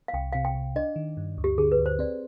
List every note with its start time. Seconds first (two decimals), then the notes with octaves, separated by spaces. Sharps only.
0.08 F5
0.14 C2 G5
0.33 C3 F5
0.45 G5
0.55 C2
0.76 D4 D#5
0.96 D#3
1.17 G2
1.38 D2
1.44 G4
1.58 D3 G#4
1.72 B4
1.79 D2
1.86 C5
1.99 C4 D5